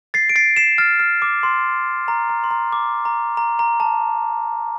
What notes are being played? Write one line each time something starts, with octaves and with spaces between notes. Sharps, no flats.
A6 C7
D7
A6 C7
C7 E7
F6 A6
F6
D6
C6
A#5
A#5
C6
A#5
D6
A#5
A#5
A#5
A5